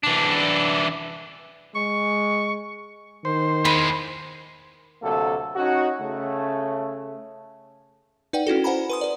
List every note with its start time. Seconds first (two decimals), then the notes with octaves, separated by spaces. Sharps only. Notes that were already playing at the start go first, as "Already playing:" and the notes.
0.03 E3 D4
1.75 G#3 C#6
3.25 D#3 C5
3.65 E2 G#3 B5
5.02 D2 C3 F#3 A#3 A4
5.56 C#4 D#4 F#4
6.00 C#3 A3
8.33 D#4 B4 D5 F#5 G5
8.47 C#4 E4 F#4 A4
8.64 C5 F#5 G#5 A#5 B5
8.90 B4 C6 D#6
9.01 B4 D5